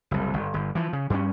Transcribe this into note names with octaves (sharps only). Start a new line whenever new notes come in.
F#1 C2
G1
G1
E3 F3
C#3
G2 G3 G#3 C#4